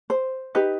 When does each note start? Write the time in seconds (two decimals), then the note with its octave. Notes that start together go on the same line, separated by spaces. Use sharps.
0.10 C5
0.55 D#4 G4 B4